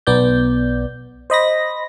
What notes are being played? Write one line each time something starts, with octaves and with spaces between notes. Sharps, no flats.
B1 B3 D5 G6
C5 D#5 B5 A#6